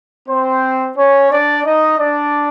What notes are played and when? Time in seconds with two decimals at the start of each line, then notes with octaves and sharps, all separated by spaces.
0.28 C4 C5
0.97 C#4 C#5
1.30 D4 D5
1.64 D#4 D#5
1.98 D4 D5